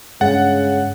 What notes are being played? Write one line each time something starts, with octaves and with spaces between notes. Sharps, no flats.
G2 C#3 G#3 F#5 A6